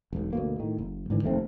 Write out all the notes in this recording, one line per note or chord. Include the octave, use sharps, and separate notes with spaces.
E1 B1
D2 B2 A#3
A2 D#3
F#1
G#2 D3 E3
F1 D#2 A3 C4